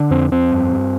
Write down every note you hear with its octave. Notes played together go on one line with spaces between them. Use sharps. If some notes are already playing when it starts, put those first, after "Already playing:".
Already playing: D3
F2 C4
F2 C4
G2
G2